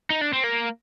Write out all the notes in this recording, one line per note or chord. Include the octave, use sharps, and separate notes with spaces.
D#4
D4
C4
A#3